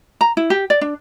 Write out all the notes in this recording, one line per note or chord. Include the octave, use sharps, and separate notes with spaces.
A#5
E4
G4
D5
D4